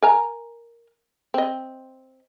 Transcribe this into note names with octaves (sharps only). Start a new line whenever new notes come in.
A#4 G#5 A#5
C4 D#5